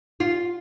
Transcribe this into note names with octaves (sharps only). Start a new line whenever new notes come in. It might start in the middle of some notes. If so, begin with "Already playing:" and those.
F4